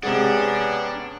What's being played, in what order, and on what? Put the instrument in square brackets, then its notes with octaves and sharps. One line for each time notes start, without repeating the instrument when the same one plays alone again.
[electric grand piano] C3 G#3 G#4 [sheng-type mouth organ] B3 C#4 F#5 [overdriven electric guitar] D4